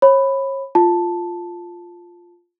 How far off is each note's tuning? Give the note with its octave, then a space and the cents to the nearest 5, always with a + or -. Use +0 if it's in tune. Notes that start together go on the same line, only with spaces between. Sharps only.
C#5 -35 B5 +5
F4 +0 A5 +0